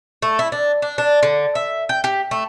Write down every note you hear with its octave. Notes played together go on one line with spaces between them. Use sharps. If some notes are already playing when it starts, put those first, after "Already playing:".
A3
E4
D4
D4
D4
D3
E5
G5
G4
A3